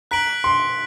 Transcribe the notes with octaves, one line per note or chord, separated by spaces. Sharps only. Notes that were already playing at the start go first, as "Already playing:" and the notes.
A#5 F#6 B6 D7 F#7
C6